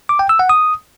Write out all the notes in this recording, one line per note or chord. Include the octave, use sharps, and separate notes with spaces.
D6
G5
E6
F#5
D#6